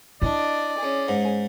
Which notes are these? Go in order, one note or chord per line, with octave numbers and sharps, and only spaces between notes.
D4 E4 D5 D#5
C#4 G#4
G#2